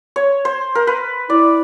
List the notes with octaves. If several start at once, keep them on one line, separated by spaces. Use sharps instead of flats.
C#5
C5
A#4
B4
E4 D5